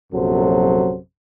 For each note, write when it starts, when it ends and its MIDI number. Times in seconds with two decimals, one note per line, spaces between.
0.13 0.97 34
0.13 0.97 42
0.13 0.97 48
0.13 0.97 54
0.13 0.97 69
0.13 0.97 72